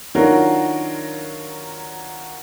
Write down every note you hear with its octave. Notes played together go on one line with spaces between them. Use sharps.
D#3 F#3 D4 F4 F#4 A#4